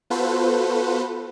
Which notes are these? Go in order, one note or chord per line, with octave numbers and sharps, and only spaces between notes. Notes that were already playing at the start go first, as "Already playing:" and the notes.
B3 F4 F#4 A4 B4 C5